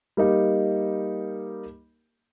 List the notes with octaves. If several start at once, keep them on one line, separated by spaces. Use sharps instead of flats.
G3 A#3 D#4 G4 A#4